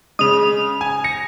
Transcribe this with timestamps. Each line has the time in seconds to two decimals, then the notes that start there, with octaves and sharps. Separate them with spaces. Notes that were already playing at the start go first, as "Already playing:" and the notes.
0.19 C#3 G#3 D#6 F7
0.81 G#5
1.04 A#6 C#7